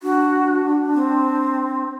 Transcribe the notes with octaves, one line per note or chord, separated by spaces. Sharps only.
D4 F#4
C4